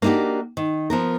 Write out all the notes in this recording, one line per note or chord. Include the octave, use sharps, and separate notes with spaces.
A#3 D4 D#4 F#4 G4
D#3
F3 B3 A#4